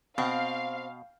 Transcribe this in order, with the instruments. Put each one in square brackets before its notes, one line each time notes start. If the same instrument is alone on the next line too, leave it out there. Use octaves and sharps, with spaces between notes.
[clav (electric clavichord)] B2 [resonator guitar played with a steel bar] C4 [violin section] F5